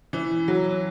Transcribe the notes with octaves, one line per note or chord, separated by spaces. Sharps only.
E3
F#3